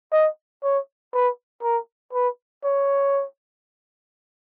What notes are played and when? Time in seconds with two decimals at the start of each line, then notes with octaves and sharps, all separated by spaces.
0.12 D#5
0.63 C#5
1.14 B4
1.63 A#4
2.13 B4
2.64 C#5